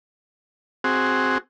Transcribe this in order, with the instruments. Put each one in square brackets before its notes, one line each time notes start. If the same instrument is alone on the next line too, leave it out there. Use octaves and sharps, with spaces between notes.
[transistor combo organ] C4 F#4 G#4